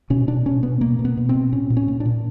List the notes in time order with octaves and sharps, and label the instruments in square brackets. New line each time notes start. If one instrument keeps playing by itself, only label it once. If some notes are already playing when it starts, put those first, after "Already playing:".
[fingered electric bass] B2 C#4
B2 D4
B2 C#4
B2 B3
B2 A#3
B2
B3
B2
C4
B2
A#2 C#4
A#2
C#4
A#2
D4
A#2